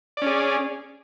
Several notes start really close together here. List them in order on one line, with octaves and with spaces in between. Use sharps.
D5 C#4 G#4